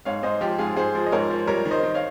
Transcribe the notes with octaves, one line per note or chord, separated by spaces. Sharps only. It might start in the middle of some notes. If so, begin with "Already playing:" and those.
G#2 C#5 F5
G#2 C5 D#5
F3 G4
G#2 F4 G#4
G#2 G#4 C5
F3
D#5
G#2 A#4 C#5
F3
G3 A#4 C#5
D#3
C5 D#5
D#3
C#5 F5